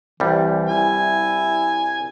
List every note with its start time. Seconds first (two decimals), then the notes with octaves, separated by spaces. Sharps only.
0.20 C2 E3 G3
0.69 E4 G#5